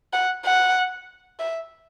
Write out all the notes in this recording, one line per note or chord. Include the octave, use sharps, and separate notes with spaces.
F#5
F#5
E5